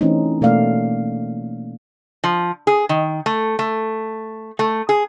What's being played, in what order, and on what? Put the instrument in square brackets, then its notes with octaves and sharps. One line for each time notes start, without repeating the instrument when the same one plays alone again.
[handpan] E3 A3 C4 C#4 D#4
B2 A3 A#3 D5 F5
[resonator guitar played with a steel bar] F3
G#4
D#3
A3
A3
A3
G#4